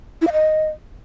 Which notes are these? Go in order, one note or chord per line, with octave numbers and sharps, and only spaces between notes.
E4
F5
D#5